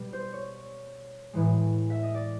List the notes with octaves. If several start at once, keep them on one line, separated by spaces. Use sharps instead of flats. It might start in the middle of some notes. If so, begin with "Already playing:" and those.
Already playing: B2 G3
C5
C#5
A2 E3 G#3
E5
D#5
D5